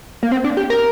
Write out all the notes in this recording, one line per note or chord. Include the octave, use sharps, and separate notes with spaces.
A#3
C4
D4
G4
A#4